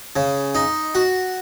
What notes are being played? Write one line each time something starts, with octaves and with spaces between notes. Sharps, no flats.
C#3
D#4
F#4